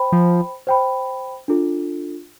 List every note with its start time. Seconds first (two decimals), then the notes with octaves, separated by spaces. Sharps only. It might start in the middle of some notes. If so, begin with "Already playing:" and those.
Already playing: C5 G5 B5
0.12 F3
0.67 C5 G5 B5
1.48 D4 F4 A4